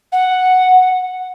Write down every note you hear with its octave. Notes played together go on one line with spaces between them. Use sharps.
F#5